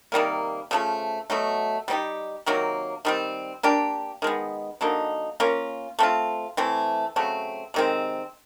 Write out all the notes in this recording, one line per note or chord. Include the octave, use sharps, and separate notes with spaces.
C3 D#3 G3 A#3
C#3 F3 A3
B2 F#3 A3
G3 C4 D#4 G4
C3 D#3 F#3 A#3
D#3 G3 C4
A#3 D4 G4
D#3 G#3 B3
D3 F#3 A#3 D#4
A#3 C#4 F4
A3 C4 F4
E3 A3 C4
C#3 F#3 A3 C4
C3 D#3 G#3 C4